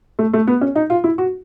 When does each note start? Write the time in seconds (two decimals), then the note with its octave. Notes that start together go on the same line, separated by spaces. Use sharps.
0.19 A3
0.33 A3
0.47 B3
0.61 C#4
0.75 D#4
0.90 F4
1.04 E4
1.18 F#4